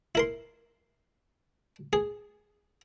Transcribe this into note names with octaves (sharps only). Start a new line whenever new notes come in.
E4 A#4 C6
G#4